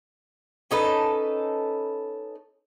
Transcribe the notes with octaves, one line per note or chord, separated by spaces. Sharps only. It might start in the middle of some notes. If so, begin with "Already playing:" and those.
C#4 D#4 A4 B4